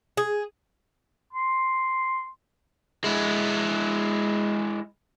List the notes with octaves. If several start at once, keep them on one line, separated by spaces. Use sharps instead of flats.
G#4
C6
G#3 E4